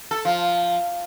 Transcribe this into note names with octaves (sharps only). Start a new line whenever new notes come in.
A4
F3